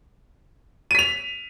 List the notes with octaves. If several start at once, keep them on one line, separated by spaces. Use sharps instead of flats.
B6 D#7 F7